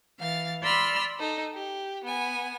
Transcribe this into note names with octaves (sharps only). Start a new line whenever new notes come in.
E3 F5 A6
D5 B5 C6 E6 F6
D#4 A4
G4
B3 G#5